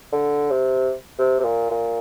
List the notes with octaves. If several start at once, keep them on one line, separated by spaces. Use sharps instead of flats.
D3
C3
C3
C3
A#2
A#2